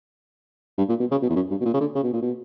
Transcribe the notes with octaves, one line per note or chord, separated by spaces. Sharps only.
G2
A#2
B2
C#3
B2
E2
F#2
G2
B2
A#2
C#3
D3
C#3
B2
A#2
B2